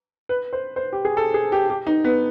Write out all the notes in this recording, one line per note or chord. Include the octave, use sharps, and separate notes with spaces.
B4
C5
C5
G4
G#4
A4
G#4
G4
G4
D#4
B3